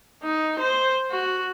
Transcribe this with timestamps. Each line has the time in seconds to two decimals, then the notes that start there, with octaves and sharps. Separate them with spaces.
0.23 D#4
0.59 C5
1.11 F#4